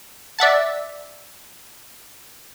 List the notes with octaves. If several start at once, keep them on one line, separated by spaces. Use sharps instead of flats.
D5 E5 F#5 A5